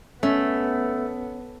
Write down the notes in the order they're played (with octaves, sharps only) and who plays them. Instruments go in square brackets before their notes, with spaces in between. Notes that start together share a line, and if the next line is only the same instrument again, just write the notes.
[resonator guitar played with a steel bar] A3 [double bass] B3 [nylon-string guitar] C#4